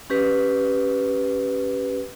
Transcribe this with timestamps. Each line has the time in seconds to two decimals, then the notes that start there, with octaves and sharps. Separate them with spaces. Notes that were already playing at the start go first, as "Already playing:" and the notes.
0.10 C#4 G4 B4